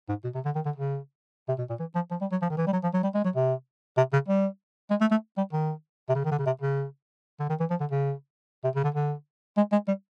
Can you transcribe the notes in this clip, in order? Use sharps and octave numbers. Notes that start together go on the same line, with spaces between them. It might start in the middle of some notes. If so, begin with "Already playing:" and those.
G#2
B2
C3
D3
D#3
D3
C#3
C3
B2
A#2
E3
F3
F3
G3
F#3
F3
D#3
E3
G3
F#3
F3
F#3
G3
G#3
F#3
C3
C3
C#3
G3
G#3
A3
A3
G3
D#3
C3
C#3
D#3
D3
C#3
C3
C#3
D3
D#3
E3
F3
D3
C#3
C3
C#3
D3
D3
G#3
G#3
G3